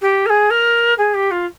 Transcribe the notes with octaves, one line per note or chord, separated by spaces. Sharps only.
G4
A#4
G#4
A#4
G#4
G4
F4